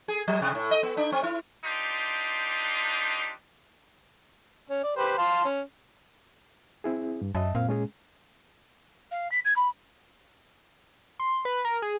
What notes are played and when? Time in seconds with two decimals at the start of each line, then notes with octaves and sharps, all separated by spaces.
0.08 G#4
0.28 F#3
0.42 C3
0.55 A2
0.71 D#5
0.83 B3
0.97 D4
1.12 C4
1.23 E4
1.65 D4 D#4 F4 G4 C5
4.70 C#4
4.84 D5
4.97 G4 B4 C5
5.18 F5 A5 C6
5.45 C#4
6.84 C4 E4 G#4
7.21 G2
7.35 F#2 D#5 E5 A5
7.55 F#2 A#2 C4 F5
7.69 G#3 C#4 G#4
9.11 F5
9.31 B6
9.44 G#6
9.56 B5
11.20 C6
11.45 B4
11.65 A#4
11.82 G#4